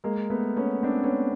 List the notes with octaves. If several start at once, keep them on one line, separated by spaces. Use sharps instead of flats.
G#3 A#3
A3 B3
B3 C#4
C4 D4
B3 C#4